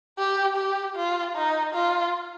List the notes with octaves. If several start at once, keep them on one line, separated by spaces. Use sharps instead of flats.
G4
G4
F4
D#4
F4